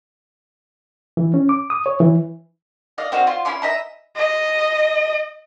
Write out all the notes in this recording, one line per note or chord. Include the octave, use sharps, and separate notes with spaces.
E3
C#4
D6
D#6
C#5
E3
D5 D#5 F5
C4 F#4 D#5 F5
F4
C#4 E4 C6 D6
D#5 E5 A#5
D#5